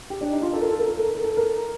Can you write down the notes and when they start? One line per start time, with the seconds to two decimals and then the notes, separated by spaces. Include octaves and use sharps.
0.10 G4
0.21 D4
0.31 D#4
0.42 F4
0.53 A4
0.61 A#4
0.70 A4
0.79 A#4
0.88 A4
0.98 A#4
1.06 A4
1.15 A#4
1.24 A4
1.37 A#4